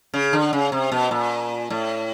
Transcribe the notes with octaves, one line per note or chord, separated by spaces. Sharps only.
C#3
D3
C#3
C3
B2
A#2
A2